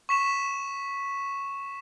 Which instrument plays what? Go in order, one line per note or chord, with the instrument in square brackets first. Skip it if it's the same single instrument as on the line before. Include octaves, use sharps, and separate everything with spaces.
[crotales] C#6 B6 E7